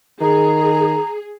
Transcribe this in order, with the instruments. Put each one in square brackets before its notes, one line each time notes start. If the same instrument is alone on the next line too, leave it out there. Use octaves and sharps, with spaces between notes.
[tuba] D#3 [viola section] G#4 [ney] A#5